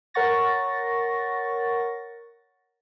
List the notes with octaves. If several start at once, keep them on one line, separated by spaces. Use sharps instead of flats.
A#4 C#5 F#5 C#6 A6 A#6